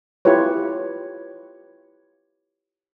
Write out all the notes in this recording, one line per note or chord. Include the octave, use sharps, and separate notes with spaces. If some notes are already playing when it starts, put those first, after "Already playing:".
E4 F4 G4 B4 C#5